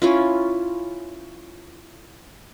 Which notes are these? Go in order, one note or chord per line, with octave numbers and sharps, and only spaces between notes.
C#4 E4 F4